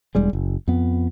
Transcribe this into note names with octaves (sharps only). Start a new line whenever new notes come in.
E1 G3 G#3
F#1
F2 B3